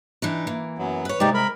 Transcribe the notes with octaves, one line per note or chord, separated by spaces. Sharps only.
E3 D4 D#4
E3 A#3
F#2 F#3 B3
B4 C#5
C3 G#3 D#4 G4 D5
A#4 B5